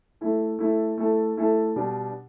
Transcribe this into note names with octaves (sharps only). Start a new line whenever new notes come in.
A3 E4 A4
A3 E4 A4
A3 E4 A4
A3 E4 A4
B2 G3 D4 G4